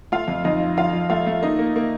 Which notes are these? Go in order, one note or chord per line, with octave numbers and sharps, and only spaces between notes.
A3 F4 F5
F2
F2 D#4 D#5
F3
F3 F4 F5
F3
A3 F4 F5
A3
A#3 D#4 D#5
A#3
A#3